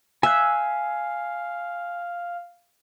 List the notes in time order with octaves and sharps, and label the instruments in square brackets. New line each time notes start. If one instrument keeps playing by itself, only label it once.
[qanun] E5 [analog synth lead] F5 [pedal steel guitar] G#5 F#6